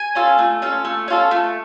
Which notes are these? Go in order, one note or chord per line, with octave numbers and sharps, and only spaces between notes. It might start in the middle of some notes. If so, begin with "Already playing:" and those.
Already playing: G#5
C#4 F4 A4
A3
C#4 F4 A4
A3
C#4 F4 A4
A3